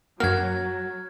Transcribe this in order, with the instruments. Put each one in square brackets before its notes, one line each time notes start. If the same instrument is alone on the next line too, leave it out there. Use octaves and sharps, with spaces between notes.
[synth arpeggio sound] F#2 A#3 [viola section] F#3 [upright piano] F#4 [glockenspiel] F6 G#6